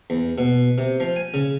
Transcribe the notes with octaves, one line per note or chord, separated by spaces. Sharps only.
E2
B2
C3
F3
G#5
C#3